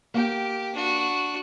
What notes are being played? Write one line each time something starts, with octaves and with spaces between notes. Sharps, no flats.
A#3 G4 G5
D4 F#4